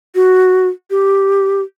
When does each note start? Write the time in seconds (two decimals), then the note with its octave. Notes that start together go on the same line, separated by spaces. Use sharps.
0.15 F#4
0.91 G4